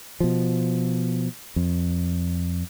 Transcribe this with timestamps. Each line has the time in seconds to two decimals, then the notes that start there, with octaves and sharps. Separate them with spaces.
0.20 B2 F3
1.56 F2